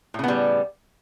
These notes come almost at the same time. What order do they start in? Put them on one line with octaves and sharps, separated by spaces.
A2 C#3 B3 G3